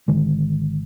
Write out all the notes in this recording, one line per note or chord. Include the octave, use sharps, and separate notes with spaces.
G#1 D3 D#3 G#3